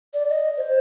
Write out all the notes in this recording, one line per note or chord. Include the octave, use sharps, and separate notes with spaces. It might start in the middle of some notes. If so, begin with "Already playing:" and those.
D5
D#5
C5